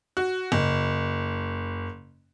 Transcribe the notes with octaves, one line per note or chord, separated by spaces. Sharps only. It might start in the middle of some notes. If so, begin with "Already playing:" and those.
F#4
F#1